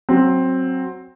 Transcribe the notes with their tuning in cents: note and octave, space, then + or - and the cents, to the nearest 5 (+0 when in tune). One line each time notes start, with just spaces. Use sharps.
F#3 +0 C4 +10